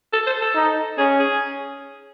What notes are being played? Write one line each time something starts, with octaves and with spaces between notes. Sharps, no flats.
A4
C5
A4
D#4
C#4 G#4
G#4